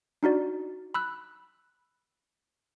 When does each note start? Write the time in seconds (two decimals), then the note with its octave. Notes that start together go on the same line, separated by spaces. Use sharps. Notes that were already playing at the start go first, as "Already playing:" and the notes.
0.23 D4 D#4 F#4 D5
0.94 B5 E6 F#6